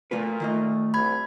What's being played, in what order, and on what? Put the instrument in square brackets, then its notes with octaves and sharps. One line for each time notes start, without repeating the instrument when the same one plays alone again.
[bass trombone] A#2 [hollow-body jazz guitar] A3 F4 B4
[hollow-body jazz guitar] D#3 F4 D#5 [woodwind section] A3
[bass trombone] C2 [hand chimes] B5 G#6